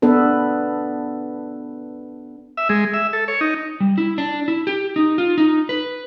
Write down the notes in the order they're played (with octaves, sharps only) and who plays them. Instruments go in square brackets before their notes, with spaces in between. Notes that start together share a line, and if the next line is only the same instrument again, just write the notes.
[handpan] B3 D4 A4 B4
[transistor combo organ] E5
G#3
E5
A4
C#5
D#4
[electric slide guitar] G3
E4
D4
E4
G4
D#4
F4
D#4
B4